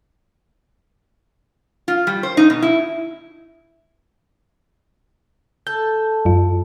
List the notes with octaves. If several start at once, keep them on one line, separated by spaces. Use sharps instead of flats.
F4
G3
C5
D#4
B2
E4
A4 G6
F#2 F4